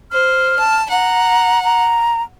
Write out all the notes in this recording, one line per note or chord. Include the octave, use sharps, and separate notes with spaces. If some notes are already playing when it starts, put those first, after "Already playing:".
C5 F6
A5
F#5 A#5
A#5